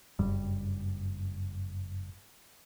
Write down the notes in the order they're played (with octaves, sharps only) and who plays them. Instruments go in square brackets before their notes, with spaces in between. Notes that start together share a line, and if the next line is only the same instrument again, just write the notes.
[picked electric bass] F#1 G2 G3